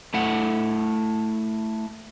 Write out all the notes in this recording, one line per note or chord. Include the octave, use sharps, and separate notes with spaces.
A3 E4 F#5